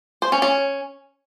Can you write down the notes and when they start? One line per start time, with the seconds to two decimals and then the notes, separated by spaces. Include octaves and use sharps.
0.22 C5
0.32 C#4
0.42 C#4